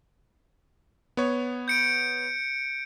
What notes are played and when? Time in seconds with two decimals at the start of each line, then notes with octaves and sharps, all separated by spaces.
1.17 B3 C#5
1.68 G6 C#7 D7